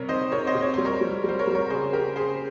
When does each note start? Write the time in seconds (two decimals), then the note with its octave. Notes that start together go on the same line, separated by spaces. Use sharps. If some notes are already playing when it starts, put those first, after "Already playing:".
Already playing: C3 G3 A#4 C#5
0.09 D#3 C5 D#5
0.32 C3 A#4 C#5
0.47 C5 D#5
0.55 C3
0.63 C#5
0.74 G3 C5
0.85 A#4 C#5
1.01 G3
1.24 G3 C5
1.39 A#4 C#5
1.47 G3
1.55 A#4 C#5
1.70 C#3 G#4 C5
1.93 C#3 G4 A#4
2.16 C#3 G#4 C5